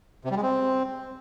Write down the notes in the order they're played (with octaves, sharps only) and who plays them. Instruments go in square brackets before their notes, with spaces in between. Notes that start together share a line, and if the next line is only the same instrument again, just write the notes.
[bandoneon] C3
G3
G#3
C4